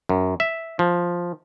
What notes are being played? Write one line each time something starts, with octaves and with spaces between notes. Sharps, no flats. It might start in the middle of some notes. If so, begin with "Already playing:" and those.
F#2
E5
F3